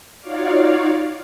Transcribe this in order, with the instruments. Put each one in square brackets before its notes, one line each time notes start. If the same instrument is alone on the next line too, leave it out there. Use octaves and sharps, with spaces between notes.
[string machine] D#4 F4 F#4 C#5 D5 F5